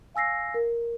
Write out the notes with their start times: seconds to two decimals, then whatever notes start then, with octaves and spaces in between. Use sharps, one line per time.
0.14 F5 G#5 E6 A#6 C7
0.54 A#4